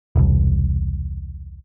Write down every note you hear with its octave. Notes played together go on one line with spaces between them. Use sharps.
E1 C2